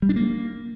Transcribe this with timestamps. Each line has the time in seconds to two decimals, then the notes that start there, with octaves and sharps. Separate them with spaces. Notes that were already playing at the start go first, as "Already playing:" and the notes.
0.02 G3
0.09 D4
0.16 A#3